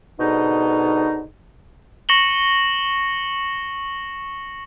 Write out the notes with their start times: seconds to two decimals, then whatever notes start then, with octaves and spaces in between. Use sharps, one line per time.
0.20 G#2 B2 D3 D#4
2.09 C#6 A#6 C#7 E7 F#7 G7